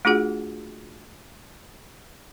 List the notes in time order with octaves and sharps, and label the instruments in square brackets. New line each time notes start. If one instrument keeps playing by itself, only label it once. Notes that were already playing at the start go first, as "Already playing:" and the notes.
[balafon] A3 D4 F4 F#4 G#4 F#5